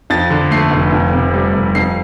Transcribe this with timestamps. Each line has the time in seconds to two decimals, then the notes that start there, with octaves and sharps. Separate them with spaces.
0.10 F2 A6
0.30 D3
0.51 A3 C7
0.71 F1
0.92 F2
1.13 C3
1.34 G3
1.54 F1
1.75 F2 C7